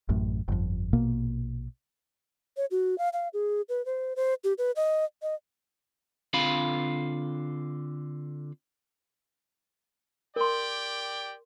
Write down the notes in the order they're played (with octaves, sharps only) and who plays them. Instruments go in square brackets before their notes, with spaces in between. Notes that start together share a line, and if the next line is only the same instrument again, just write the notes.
[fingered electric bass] A1 F#2 A2
G1 F2
A#1 B2 A#3
[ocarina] C#5
F#4
F5
F5
G#4
B4
C5
C5
G4
B4
D#5
D#5
[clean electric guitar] D3 C4 F4 F5 B5
[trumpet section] G4 D5 G5 [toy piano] A#4 C6